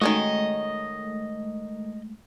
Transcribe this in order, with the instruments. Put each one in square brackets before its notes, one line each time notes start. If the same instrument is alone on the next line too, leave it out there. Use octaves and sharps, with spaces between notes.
[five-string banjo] D#3 C#4 F#4 [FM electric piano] G#3 A3 [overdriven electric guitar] D#5